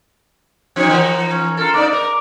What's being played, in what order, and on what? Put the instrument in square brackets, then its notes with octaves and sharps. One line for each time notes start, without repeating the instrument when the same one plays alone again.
[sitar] F3 C4 D#4
E3 A#4
[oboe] C#4
[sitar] F4 A4 [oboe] A#4
[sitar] A#3 D#4 D5 [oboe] D6
[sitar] A#4